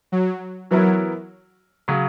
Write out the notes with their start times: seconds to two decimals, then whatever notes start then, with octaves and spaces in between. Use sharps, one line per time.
0.12 F#3
0.71 E3 F#3 B3 E4 A#4
1.88 C#3 F#3